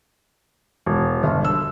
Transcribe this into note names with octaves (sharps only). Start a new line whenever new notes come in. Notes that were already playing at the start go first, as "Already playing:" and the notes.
E1
G1
E6